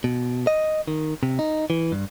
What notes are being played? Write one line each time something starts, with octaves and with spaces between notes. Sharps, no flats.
B2
D#5
D#3
C3
D#4
E3
G2